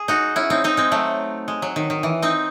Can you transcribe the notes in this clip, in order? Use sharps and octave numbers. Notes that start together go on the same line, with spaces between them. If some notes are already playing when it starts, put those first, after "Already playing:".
Already playing: G#4
D#4 F#4
C#4 E4
C4 D#4
C4 D#4
G#3 C4
F#3 A3
G#3
F#3
D#3
D#3
E3
C4 D#4